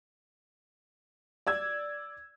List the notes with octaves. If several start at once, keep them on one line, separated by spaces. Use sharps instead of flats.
D5 E6 G#6